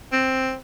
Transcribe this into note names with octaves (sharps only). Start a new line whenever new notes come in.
C4